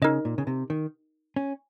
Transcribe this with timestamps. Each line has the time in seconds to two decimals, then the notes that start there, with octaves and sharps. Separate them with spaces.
0.02 C#3 D#4 A#4 D#5
0.25 A#2
0.38 C#3
0.47 C3
0.70 D#3
1.36 C#4